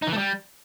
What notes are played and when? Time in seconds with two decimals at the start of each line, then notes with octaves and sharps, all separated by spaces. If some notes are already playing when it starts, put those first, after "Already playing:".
0.02 D#4
0.07 E3
0.12 A3
0.17 G3